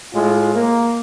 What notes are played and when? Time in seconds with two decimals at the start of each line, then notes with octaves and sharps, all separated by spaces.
0.14 A2 G#3 F4
0.56 A#3